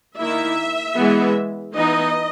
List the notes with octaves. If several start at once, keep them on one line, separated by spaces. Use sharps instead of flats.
D#3 A#3 E4 E5
E3 G#3 B3
E3 B3 D#4 D#5